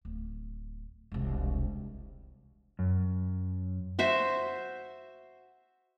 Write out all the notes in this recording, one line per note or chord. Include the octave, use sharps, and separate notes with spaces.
D1
E1 C2
F#2
F#4 C5 E5